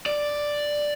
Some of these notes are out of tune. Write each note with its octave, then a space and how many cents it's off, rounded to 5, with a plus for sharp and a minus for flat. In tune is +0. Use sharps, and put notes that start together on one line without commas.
D5 +5